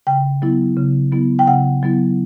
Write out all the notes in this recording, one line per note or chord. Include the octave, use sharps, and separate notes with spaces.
C#3 G5
F#3 B3 E4
C#3
F#3 B3 E4
G5
C#3 F#5
F#3 B3 E4